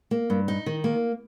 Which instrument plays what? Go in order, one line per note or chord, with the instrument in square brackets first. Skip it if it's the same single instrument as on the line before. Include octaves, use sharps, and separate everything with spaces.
[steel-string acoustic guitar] A#3
G2
D#4
D#3
A#3